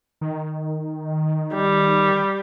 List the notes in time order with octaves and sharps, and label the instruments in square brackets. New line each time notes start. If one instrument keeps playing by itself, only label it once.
[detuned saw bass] D#3
[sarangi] G3